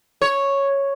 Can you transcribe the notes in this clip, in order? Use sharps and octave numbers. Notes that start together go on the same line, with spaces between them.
C#5